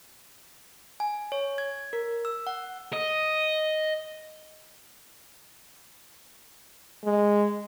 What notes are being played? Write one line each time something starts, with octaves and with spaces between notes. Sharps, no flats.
G#5
C#5
G#6
A#4
E6
F#5
D#5
G#3